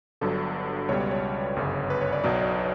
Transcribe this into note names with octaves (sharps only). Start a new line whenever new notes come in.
G1 G2 F#3 A4
C#2 B2 G3 C#5
D5
C#5
G1 F#2 C#3
B4
C#5
D5
B1 B2 F#3 D5
C#5
D5